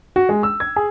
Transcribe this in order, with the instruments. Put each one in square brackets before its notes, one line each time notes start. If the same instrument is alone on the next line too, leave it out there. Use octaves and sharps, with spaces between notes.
[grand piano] F#4
G#3
E6
G#6
G#4